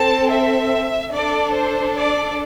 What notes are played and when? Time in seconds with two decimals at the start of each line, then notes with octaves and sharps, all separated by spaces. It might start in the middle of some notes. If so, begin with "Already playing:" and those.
Already playing: C4 A4 A5
0.30 E5
1.12 D4 A4 D5
1.53 C5
1.95 D5